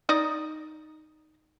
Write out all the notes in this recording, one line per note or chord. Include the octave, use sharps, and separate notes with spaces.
D#4 D5 D#5